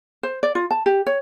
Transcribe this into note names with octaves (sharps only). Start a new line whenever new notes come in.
C5
D5
F4
A5
G4
C#5